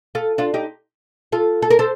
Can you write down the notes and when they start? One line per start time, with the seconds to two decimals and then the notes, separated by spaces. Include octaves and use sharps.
0.15 F4 A4
0.38 D4 F4
0.54 D#4 G4
1.32 F4 A4
1.62 A4
1.70 A#4
1.79 A4 C5